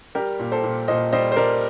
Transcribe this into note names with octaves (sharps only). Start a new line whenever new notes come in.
G3 G4 A#4
A#2
A4 C5
A#2
A#2 C5 D#5
G3 C5 D#5
C5
G3 A#4 D5